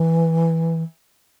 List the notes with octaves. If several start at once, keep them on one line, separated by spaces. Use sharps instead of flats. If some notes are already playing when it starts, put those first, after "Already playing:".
Already playing: E3